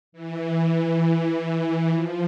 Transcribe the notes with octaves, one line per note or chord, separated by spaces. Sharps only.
E3
F3